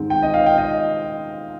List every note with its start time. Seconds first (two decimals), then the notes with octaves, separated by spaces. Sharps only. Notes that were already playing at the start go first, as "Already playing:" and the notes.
Already playing: G#2 D#3 G#3 C4
0.10 G5
0.23 D#5
0.34 F5
0.46 G5
0.58 D#5